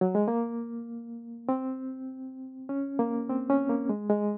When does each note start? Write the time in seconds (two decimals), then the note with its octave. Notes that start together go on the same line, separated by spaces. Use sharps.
0.01 F#3
0.15 G#3
0.28 A#3
1.49 C4
2.69 C#4
2.99 A#3
3.30 C4
3.50 C#4
3.70 A#3
3.89 G#3
4.10 G#3